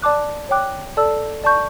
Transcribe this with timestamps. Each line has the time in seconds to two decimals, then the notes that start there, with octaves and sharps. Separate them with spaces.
0.02 D5 A5 D6 F#6
0.49 C#5 G5 D6 F#6
0.97 A4 D5 A5 E6
1.44 D5 A5 C#6 G6